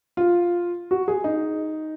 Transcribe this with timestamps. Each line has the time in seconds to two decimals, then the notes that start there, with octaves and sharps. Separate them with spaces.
0.17 F4
0.91 F#4
1.08 G#4
1.24 D#4